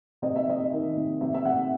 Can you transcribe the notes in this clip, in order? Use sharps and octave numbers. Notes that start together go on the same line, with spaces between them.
C3 D#5
E5
C3 D#5
D#3
C3
C3 E5
E5
C3 F#5